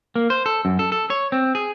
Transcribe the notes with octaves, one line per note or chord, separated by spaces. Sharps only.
A#3
C5
A4
F#2
A4
A4
C#5
C4
G#4